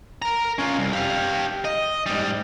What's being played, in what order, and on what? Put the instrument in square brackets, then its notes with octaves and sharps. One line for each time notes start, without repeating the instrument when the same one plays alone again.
[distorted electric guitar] A#4 A#5
C#4 F4
C2
G4 F5
D#5
G#2 G3